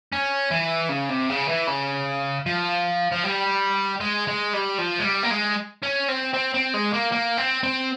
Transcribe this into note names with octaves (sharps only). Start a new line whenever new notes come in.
C#4
E3
C#3
C3
C#3
E3
C#3
F3
F3
G3
G#3
G#3
G3
F3
G#3
G3
A#3
G#3
C#4
C4
C4
C4
G#3
A#3
A#3
C4
C4